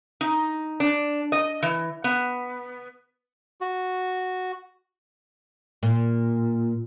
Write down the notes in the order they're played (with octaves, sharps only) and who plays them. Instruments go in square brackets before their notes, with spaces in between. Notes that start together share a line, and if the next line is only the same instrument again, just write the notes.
[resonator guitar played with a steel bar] D#4
D4
D#5
E3
B3
[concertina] F#4
[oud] A#2